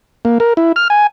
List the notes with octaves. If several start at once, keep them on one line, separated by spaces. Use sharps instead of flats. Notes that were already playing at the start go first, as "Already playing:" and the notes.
A#3
A#4
E4
F6
G#5